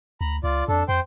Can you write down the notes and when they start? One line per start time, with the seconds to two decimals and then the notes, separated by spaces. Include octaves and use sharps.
0.21 D2 A#5 B5
0.44 C#2 F4 D5
0.68 F2 D4 A4
0.89 F2 C5 G5 C6